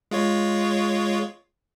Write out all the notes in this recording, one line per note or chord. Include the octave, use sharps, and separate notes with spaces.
G#3 F4 C#5